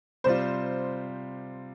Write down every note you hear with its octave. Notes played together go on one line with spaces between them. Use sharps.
C3 G3 F4 C5